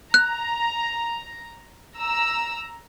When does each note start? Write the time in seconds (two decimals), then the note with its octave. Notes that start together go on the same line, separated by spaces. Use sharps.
0.14 A#5 F#6
1.98 A#5 E6